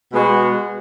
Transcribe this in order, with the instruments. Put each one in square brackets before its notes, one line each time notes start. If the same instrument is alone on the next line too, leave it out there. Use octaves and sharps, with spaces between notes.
[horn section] B2 G#3 B3 F#4